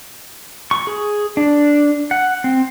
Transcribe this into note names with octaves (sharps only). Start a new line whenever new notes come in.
C#6
G#4
D4
F#5
C4